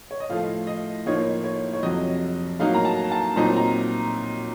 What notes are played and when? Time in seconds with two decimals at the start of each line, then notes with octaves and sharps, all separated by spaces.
0.11 C#5
0.20 D#5
0.29 A2 F3 A3 F5
0.67 D#5
1.06 A2 F3 A#3 D#4 C#5
1.44 C#5
1.73 C#5
1.83 F2 C3 F#3 D#5
2.59 A2 F#3 A#3 D#4 F5
2.74 A#5
2.85 A5
3.12 A5
3.36 A#2 F#3 C4 D#4 A#5
3.56 A#5